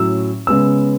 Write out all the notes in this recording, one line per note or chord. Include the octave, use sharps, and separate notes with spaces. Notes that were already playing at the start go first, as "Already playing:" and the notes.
Already playing: A2 F#3 C#4 E6
C#3 G#3 B3 E6